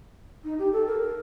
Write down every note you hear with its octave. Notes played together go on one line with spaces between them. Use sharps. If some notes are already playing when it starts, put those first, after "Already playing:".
D#4
G4
A4
A#4
A#4